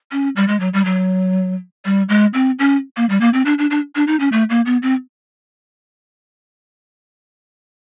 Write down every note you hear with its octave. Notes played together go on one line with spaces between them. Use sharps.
C#4
G3
G#3
F#3
G3
F#3
G3
G#3
C4
C#4
A#3
G3
A#3
C4
D4
D4
D4
D4
D#4
C#4
A3
A#3
B3
C4